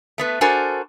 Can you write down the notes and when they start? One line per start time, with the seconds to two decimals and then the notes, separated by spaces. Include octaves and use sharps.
0.18 A3 B3 B4
0.41 D4 F#4 A4 A#4 C5 G#5